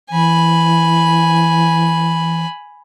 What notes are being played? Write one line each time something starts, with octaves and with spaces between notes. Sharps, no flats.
E3 G#5 B5